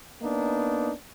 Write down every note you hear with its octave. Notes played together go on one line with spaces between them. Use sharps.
A#3 B3 D4 D#4